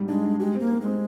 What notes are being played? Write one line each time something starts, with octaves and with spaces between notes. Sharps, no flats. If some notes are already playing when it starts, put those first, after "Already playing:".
Already playing: G#2 G3
G#3 D4
D4
G#3 G4
A#3 C4
C4
G#3
C4